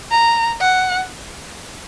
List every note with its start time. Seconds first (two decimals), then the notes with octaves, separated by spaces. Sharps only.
0.11 A#5
0.61 F#5